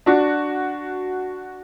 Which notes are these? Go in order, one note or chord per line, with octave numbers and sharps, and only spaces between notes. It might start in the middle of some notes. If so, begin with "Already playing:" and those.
D4 F#4